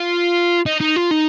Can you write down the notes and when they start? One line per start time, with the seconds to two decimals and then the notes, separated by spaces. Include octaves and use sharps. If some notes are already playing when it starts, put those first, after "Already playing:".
Already playing: F4
0.66 D#4
0.80 D#4
0.96 F4
1.11 D#4